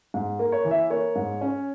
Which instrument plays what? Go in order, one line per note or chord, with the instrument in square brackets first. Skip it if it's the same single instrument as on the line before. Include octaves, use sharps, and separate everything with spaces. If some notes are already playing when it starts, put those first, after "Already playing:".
[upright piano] G#2
A#3
C#5
E3
E5
A#3 C#5
G#2
C#4